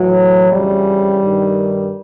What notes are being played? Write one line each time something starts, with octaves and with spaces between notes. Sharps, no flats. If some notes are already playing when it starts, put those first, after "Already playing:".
Already playing: A2 E3 F#3
F2 C#3 E3 G3
G2 D#3